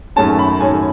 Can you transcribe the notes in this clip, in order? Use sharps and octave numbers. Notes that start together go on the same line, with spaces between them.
F#2 D#3 A3 C#4 A5
B5
F#2 D#3 A3 C#4 G#5